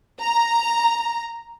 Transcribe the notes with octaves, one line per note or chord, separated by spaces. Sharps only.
A#5